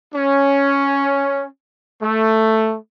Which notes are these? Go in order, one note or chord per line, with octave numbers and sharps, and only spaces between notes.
C#4
A3